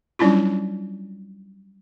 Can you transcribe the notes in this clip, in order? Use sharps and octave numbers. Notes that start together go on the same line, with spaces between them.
F#3 G3 C#4 D4 E4 F4